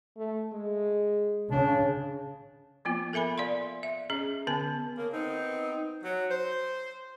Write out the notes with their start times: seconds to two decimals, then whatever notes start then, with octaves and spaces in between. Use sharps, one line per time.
0.17 A3
0.53 G#3
1.51 C#3 D4
2.85 F3 A#3 B3 F4
3.13 A4 A#4 E5 G#5 B5
3.38 D5 F5 C6
3.83 E5
4.10 C#4 G#4 D#5
4.47 D3 B3 A5
4.97 C#3 A#3
5.13 B3 C4 D#4
6.03 F#3
6.31 C5